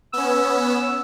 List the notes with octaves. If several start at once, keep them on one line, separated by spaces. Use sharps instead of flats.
B3 C#4 E6